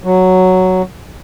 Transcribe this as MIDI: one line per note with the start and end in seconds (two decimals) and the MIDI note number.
0.04 0.82 54